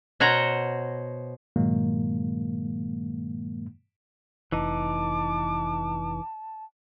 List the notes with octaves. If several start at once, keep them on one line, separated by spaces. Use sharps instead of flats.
B2 C5 C#5 F#5 A#5
G2 A#2 D#3 F#3 G#3 A#3
F1 E3 D#4 A5 D6